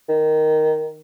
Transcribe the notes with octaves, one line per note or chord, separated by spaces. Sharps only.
D#3